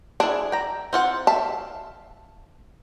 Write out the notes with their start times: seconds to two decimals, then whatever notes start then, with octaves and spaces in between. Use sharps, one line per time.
0.20 D4 E4 G#4
0.52 G5 A#5
0.93 C4 F4 F#5
1.27 E5 F5 A5